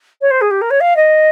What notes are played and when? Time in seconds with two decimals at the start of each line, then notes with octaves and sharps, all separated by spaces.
0.21 C#5
0.30 C5
0.41 G#4
0.50 G4
0.61 A#4
0.70 C#5
0.80 F5
0.96 D#5